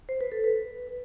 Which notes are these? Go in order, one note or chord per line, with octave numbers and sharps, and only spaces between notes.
C5
B4
A4
B4